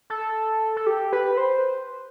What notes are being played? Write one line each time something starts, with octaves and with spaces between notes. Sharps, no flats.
A4
A4
G4
B4
C5